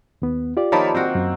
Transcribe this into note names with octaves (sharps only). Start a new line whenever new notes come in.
D#2 B3
F4 G4 D5
D#3 F3 A#3 C#5 A5 B5
C4 F#4 A#4 C5
F#2